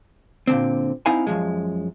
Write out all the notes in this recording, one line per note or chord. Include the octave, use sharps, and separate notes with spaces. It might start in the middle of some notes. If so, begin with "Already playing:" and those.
A#2 D3 C4
C4 D#4 E4 F5 F#5 G#5
F#2 D3 F3 G#3